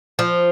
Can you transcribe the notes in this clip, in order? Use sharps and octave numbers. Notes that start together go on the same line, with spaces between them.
F3